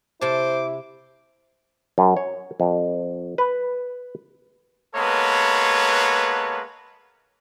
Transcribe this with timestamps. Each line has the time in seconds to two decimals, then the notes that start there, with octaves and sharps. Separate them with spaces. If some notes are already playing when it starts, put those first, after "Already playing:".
0.21 C3 E4 C5 A5 D6
1.98 F#2
2.17 C#5
2.60 F2
3.38 B4
4.96 G#3 A#3 B3 A4 B4 C#5